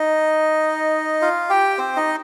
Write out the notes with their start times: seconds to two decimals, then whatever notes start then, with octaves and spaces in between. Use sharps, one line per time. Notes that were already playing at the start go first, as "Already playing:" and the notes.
Already playing: D#4 D#5
1.22 F4 F5
1.50 G4 G5
1.78 C4 C5
1.96 D#4 D#5